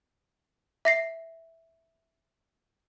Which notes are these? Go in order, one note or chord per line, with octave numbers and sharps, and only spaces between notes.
E5 A#6 C7